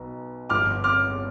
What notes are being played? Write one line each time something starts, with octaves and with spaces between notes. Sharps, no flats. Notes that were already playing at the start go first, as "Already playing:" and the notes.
Already playing: B1 B2 B3
G1 G2 F3 D6 F6
D6 F6